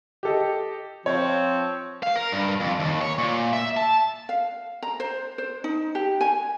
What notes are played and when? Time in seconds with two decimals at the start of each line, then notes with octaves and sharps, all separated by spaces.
0.23 G4 A4 D#5
1.06 F3 C4 C#5
2.03 F5
2.16 A#4
2.32 G2
2.60 F2
2.79 D#2
3.01 C#5
3.18 A#2
3.53 E5
3.77 A5
4.29 F5
4.83 A#5
5.00 C5
5.38 C5
5.64 D#4
5.95 G4
6.21 G#5